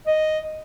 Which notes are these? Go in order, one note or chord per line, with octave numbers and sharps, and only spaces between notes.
D#5